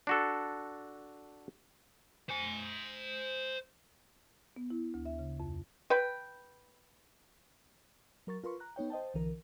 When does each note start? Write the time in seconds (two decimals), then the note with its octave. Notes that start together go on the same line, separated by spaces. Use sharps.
0.07 D4 F#4 A4
2.30 C5 G#5
4.56 B3
4.70 E4
4.94 D2
5.05 E5
5.19 C#3
5.40 F2
5.90 B4 G5
8.27 F#3 A#4 C#6 A6
8.44 F4 A#4 B4 C6 C#6
8.60 A#5 F#6
8.76 B3 D#4 C#5 G5
8.90 C5 D#5 G5 A5
9.14 B1 D3 E3 A#4